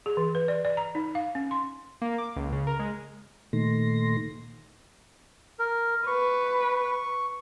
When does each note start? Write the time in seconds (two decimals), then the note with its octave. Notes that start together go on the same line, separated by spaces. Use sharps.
0.06 G#4
0.17 E3
0.35 B4
0.48 D5
0.65 D5
0.77 A#5
0.95 D#4
1.15 F5
1.35 C#4
1.51 C6
2.02 A#3
2.18 D6
2.36 C#2
2.53 C#3
2.67 A#4
2.79 G#3
3.53 A#2 D#3 A3 C6 A#6
5.59 A#4
6.07 B4 C#6